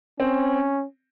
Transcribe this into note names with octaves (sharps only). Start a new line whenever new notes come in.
C4 C#4